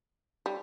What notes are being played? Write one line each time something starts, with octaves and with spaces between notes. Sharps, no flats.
G3